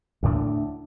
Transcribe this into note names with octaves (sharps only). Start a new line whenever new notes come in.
D2 A2 D4